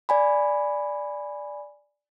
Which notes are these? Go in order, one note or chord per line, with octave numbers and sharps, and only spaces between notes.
D5 G#5 B5